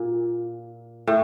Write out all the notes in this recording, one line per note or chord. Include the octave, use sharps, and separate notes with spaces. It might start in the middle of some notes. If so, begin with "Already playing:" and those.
Already playing: A#2
A2